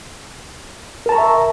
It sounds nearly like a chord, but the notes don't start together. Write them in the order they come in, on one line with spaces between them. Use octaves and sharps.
A#4 A5 A#5 C#6 E5